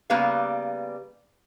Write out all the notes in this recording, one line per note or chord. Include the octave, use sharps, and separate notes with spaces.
C#3 G3 A#3 B3 B4 F5